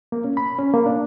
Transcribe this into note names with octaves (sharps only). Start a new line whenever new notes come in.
A#3
C#4
B5
C#4
A#3
D4